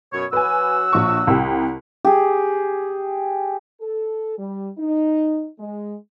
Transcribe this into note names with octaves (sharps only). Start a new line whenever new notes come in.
F#2 B2 C#5
F#3 F#4 B4 G#5 E6
A#1 C#6
C2 G4
G4 G#4
A4
G3
D#4
G#3